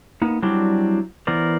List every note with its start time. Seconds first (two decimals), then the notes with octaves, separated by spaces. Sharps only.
0.22 A#3 B3 D#4
0.43 F#3 G3 C4 D4 E4 G4
1.27 E3 B3 A#4 C5 D5